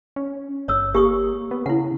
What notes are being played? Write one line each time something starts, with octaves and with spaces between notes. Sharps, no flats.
C#4
G1 C#5 D#6 E6
A#3 G4 C#6 D#6
B3
C#3 E4 F#5